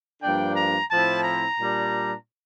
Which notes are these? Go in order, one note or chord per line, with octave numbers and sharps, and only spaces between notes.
G2 F3 A#3 D4 G5
A#5
A2 F3 C4 E4 A5
A#5
A#2 G3 D4